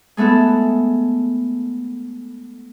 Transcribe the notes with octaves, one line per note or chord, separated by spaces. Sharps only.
G#3 A3 B3 E4 A4